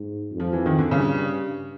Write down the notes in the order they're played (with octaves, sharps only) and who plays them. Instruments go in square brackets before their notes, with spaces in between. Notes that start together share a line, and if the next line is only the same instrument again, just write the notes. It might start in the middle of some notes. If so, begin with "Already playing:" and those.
Already playing: [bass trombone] G#2
F2
[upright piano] F3
E3
D#3
D3
[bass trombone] G2 [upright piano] C#3